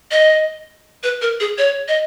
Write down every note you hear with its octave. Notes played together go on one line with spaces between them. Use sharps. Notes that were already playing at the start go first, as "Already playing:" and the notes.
D#5
B4
A#4
G#4
C#5
D#5